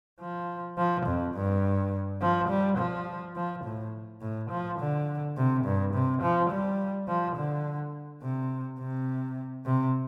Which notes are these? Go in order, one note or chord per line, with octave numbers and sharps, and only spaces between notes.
F3
F3
F2
G2
F3
G3
F3
F3
A2
A2
F3
D3
C3
G2
C3
F3
G3
F3
D3
C3
C3
C3